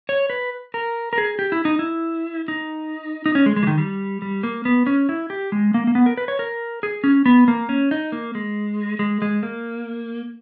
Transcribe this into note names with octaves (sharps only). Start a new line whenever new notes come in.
C#5
B4
A#4
A#4
G#4
G4
E4
D#4
E4
D#4
D#4
C#4
G#3
G#3
E3
D#3
G3
G3
A#3
B3
C#4
E4
G4
G#3
A#3
A#3
B3
A#4
B4
C#5
A#4
G#4
C#4
B3
A#3
C#4
D#4
A#3
G#3
G#3
G#3
A#3